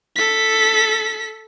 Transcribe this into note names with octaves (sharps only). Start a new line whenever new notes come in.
A4 B6